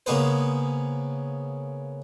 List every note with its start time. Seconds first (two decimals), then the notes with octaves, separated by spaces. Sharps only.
0.06 C#3 G#3 A#3 B3 B4 C5